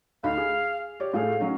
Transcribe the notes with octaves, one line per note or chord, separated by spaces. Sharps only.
D2 D#4 F5 B5
G#4
G4 C#5 D5
A2 A3 G#4 F5
F#3 C#4 D#4